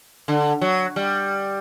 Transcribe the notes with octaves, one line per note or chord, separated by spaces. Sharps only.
D3
F#3
G3